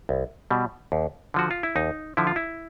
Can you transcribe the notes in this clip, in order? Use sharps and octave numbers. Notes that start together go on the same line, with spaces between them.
C2
B2 G3
D#2
D3 F3 F#4
F4
E4
D#2 D#4
D3 F3 E4
F4
E4